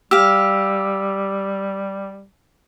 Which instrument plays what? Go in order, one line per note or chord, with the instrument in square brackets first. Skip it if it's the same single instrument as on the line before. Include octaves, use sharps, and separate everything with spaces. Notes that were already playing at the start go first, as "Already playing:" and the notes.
[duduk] G3 [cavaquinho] G4 F5 [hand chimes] E6